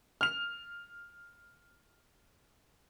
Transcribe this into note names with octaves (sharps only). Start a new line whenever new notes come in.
F6 F7